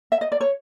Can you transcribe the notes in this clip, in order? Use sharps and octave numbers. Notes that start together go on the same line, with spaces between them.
E5
D#5
D5
C#5